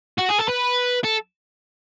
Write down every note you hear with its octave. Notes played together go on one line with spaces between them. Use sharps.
F#4
G#4
A4
B4
A4